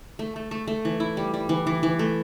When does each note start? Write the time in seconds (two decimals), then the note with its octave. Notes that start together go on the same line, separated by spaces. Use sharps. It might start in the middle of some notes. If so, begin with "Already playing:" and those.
0.19 A3
0.36 A3
0.51 A3
0.68 A3
0.85 E3
1.00 E4
1.17 G3
1.34 G3
1.49 E3
1.67 E3
1.83 E3
1.99 A3